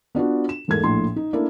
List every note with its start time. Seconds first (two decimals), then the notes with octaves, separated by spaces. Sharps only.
0.15 B3 D4 F4 F#4
0.49 E7
0.68 E2 G#2 A3 A#3 G#6
0.83 A#1 A2 A4 C6
1.16 D#4
1.33 A3 A#3 D4 E4 A#4